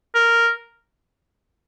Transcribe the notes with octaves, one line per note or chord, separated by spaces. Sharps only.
A#4